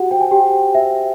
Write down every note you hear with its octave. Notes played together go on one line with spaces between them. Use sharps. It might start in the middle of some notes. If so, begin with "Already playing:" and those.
Already playing: F#4 G4 F#5
C5 G5
G#5
G4 G5
C5
C5 E5